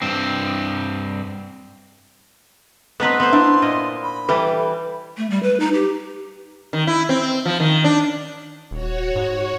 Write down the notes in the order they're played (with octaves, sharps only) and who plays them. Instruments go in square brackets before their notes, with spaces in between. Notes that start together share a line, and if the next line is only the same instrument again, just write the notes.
[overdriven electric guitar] G2 C4
[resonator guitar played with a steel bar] A3 C4 [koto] B3 D#4 B4
[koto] B3 C5 [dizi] C6
[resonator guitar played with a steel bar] D4 E4 E5
[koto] A#2 D#5
[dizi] B5
[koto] E3 G3 [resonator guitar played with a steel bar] A4 B4
[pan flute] A3
G3
B4
D#4
G4
[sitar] D#3
E4
C4
F3
D#3
D4
[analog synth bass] D#1 [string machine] F#4 C#5
[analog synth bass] G#2